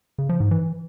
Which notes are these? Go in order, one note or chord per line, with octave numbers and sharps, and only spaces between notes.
C#3
F3
G#2
E3